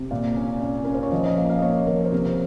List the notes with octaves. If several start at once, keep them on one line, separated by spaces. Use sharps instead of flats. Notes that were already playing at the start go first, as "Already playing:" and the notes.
Already playing: C3
A#2
C#4
C#4
C#4 A#4
C5
C#5
F3 D#5
D#5
A#3 A#4
F5
D#5
A#3 C#5
F3 A#4
C5
C3 A#4